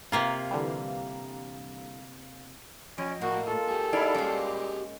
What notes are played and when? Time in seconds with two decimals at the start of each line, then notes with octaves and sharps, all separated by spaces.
0.12 C3 A#3 F4 F5 A#5
0.51 D3 E3 G3
2.98 F3 C#4 D#5
3.21 A2 A#3 F#4
3.47 F4 A4
3.68 G4 G#4
3.93 D#4 E4 D5 F5
4.14 A#2 G3 G#3 C#4